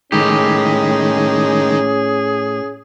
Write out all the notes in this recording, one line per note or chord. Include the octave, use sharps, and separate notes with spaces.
A2 D#3 G#3 C#4 D#4 G4 G#4